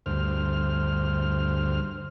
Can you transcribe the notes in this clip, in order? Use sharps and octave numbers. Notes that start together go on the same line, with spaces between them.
D2 G2 C5 F6